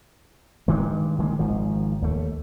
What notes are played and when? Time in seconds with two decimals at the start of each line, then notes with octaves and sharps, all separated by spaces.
0.68 G2 D#3 G#3
1.18 D#3 G#3 A#3
1.39 G#1 G#2 D#3 F3
2.02 D#2 A3